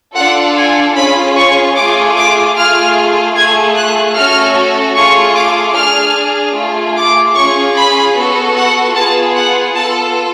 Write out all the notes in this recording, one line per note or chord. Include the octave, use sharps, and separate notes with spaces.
D4 F4 A4 F#5
G#5
C#4 F4 G#4 B5
C#6
A3 F4 G#4 D6
D6
A3 F4 G#4 F6
A3 F4 G#4 G#6
F#6
A3 C#4 F#4 A4 F6
A3 F4 G#4 C#6
D6
D4 G#4 F6
A3 F4 G#4
D6
C#4 F4 G#4 C#6
B5
B3 F#4 A4
F#5
B3 F4 G#4 A5
F#5
B3 F4 A4 A5